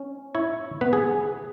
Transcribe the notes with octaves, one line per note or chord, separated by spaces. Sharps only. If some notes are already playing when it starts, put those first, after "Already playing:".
Already playing: C#4
E4 C#5
B3 B4
G#4